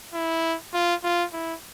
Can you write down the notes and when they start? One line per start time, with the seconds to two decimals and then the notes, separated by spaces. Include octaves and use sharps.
0.14 E4
0.74 F4
1.04 F4
1.33 E4